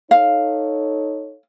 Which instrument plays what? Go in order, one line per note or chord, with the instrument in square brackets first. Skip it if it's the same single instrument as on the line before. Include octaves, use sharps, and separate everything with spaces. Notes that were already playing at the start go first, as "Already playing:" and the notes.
[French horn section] D#4 A4 C#5 [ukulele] F5